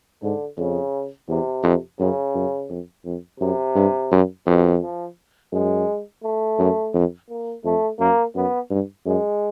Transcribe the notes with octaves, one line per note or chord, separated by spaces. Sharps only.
G#2 D3
F2 C#3
E2 C3
F2
F#2 C#3
F#2
F2
F2
F#2 C3
G2
F#2
F2 B2
F3
F#2 G#3
A3
F#2
F2
A#3
F2 A3
F#2 A#3
F#2 B3
G2
F#2 G#3